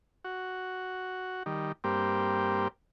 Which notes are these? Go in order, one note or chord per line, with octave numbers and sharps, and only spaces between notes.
F#4
D#3 G3
G2 A#3 C4 G4